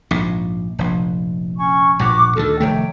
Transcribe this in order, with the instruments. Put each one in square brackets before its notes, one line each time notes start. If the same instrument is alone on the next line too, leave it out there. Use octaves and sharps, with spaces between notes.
[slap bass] A#1 G#2
F1 A#1
[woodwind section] C#4 G#5 C#6
[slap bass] A#1 G2 A#2 [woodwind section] F#5 C#6 D6
[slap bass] D2 C3 D#3 [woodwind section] A4
[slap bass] F1 D#3 A3 [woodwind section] C3 C#5 G5